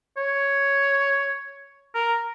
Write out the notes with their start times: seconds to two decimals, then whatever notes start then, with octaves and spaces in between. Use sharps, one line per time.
0.17 C#5
1.95 A#4